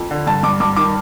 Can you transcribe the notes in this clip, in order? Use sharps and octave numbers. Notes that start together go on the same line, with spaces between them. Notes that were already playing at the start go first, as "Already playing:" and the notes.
Already playing: F2
D3
G2 A5
G2 D6
G2 D6
D#3 D6